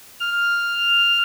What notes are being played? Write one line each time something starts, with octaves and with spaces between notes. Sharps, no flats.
F6